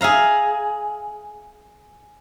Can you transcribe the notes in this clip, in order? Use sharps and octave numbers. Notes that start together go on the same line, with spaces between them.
G#4 E5 F5 A#5